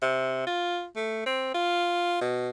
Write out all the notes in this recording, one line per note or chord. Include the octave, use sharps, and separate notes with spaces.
C3
F4
A3
C4
F4
B2